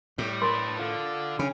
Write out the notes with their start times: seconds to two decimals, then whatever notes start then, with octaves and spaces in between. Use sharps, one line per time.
0.18 A2 G3
0.42 D4 A#4 B4 B5 C6
0.78 D3 F4
1.39 C#3 C#4 D4 B5